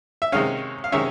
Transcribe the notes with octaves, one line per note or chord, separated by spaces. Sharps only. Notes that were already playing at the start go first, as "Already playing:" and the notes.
E5
C3 D#3 G#3 C#4 F5
F5
C3 D#3 G#3 C#4 E5